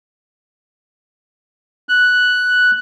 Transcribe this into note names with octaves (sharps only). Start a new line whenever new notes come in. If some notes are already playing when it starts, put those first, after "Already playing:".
F#6